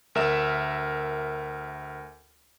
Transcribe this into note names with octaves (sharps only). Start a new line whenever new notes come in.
D2 A#4 E5 E7